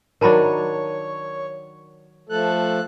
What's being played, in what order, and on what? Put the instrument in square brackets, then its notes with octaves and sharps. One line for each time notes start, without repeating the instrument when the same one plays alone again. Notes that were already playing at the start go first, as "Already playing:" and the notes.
[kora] D#3 F#3 D4 [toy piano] A#4 A5 B5 [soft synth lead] C#5
[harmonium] F3 A3 A4 [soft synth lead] F#6